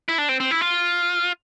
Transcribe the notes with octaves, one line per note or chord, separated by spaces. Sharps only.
E4
D4
C4
C4
E4
F4